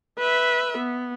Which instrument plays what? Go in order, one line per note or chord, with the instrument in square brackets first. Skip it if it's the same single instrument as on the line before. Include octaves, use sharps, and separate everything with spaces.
[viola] B4 E5
B3